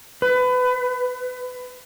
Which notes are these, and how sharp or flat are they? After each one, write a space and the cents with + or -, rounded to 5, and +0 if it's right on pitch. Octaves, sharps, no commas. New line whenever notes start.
B4 +25